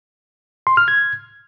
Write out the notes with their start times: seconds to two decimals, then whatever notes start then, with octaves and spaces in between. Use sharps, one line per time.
0.67 C6
0.77 F6
0.88 G#6